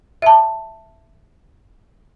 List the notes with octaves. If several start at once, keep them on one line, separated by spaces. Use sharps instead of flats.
E5 A5